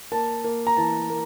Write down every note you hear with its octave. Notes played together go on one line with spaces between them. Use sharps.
A#3 A5
A#3
A#5
E3 A5
A#3